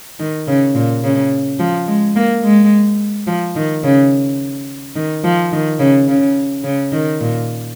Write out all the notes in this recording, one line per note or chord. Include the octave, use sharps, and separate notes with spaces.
D#3
C#3
A#2
C#3
F3
G#3
A#3
G#3
F3
D#3
C#3
D#3
F3
D#3
C#3
C#3
C#3
D#3
A#2